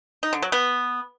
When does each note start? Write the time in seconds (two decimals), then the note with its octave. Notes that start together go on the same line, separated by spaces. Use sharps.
0.23 D#4
0.33 D3
0.42 F#3
0.52 B3